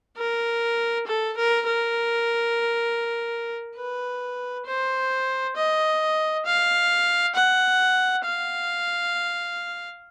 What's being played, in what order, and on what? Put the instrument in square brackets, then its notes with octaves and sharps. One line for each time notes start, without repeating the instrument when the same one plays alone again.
[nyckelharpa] A#4
A4
A#4
A#4
B4
C5
D#5
F5
F#5
F5